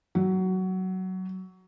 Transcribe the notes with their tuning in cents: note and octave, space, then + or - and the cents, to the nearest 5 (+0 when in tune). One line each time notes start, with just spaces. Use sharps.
F#3 +15